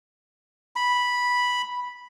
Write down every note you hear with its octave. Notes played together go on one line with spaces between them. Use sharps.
B5